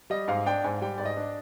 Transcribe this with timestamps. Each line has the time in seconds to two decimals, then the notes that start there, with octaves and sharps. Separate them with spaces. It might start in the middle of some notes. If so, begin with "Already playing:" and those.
0.10 G3 D#5
0.28 G#2 F5
0.46 D4 G5
0.64 G#2 G#5
0.81 G3 G5
0.98 G#2 D5
1.06 D#5
1.17 D4